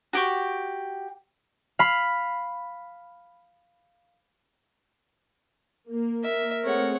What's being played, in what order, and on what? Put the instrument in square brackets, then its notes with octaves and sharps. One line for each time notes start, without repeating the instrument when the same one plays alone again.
[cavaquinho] F#4 G4 G5 C#6
[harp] F5 B5
[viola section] A#3
[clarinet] A#4 [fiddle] E5
[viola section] A3 C4 G#4 [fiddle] C#5 F#5